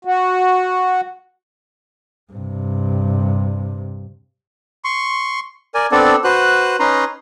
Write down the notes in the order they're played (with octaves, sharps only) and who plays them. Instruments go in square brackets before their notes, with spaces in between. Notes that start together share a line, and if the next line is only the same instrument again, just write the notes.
[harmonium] F#4
[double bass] G2 C3
[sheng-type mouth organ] C6 C#6
A#4 D5 G#5
B3 C4 D4 A4 D5
F#4 B4 C5 F#6
C#4 D#4 B4 A#5 C6